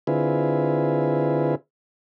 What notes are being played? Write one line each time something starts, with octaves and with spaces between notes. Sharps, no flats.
D3 C4 E4 F4 G#4 B4